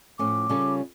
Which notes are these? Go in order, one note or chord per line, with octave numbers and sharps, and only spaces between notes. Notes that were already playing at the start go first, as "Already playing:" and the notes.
A2 F3 A3 C#4 D6
C#3 G3 C#4 F4 A4